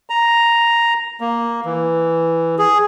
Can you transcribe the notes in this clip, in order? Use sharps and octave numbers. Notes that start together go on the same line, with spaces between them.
A#5
A#3
E3
G#4